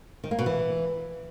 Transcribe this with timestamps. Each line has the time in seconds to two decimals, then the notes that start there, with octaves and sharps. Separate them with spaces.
0.24 D#3
0.31 A#3
0.39 B2
0.46 E3